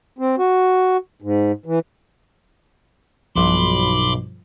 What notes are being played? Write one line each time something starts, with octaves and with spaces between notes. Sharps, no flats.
C4
F#4
G#2
E3
B1 G2 F3 B5 C6 D6